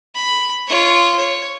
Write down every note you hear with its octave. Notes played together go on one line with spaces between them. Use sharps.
B5
F4 C#5
C#5